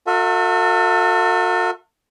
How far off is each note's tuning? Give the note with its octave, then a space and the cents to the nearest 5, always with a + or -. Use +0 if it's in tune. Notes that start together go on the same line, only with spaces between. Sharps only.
F#4 -40 A4 +40 E5 +0